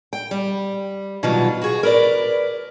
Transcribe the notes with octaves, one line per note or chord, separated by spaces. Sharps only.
G5
G3
B2 D#3 F#3 G3 F4
F#4 G#4
A#4 B4 D5